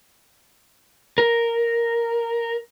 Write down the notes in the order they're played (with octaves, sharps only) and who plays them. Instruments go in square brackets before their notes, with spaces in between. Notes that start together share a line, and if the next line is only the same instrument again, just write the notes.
[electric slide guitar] A#4